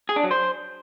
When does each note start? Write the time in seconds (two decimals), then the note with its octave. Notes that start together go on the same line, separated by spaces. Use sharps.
0.09 G#4
0.16 D4
0.24 F#3
0.31 C5